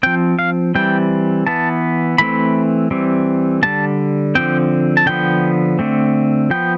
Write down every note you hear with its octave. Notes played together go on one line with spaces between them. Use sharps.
F3 C4 G5
F5
E3 G3 C4 G5
E3 B3 A5
E3 A3 C4 B5
E3 G3 C4
D3 G3 B3 A5
D3 F3 C4 G5
A5
D3 F3 B3 G5
D3 A3 C4
F3 B3 G5